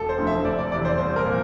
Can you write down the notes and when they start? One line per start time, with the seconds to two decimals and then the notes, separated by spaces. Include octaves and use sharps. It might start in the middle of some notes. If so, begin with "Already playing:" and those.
Already playing: E1 A4
0.09 C5
0.18 D2 D3 F3
0.27 E5
0.44 F1 D5
0.58 D5
0.72 E2 C3 E3 D5
0.85 C5
0.98 C2 C5
1.16 A#4
1.25 A#2 F3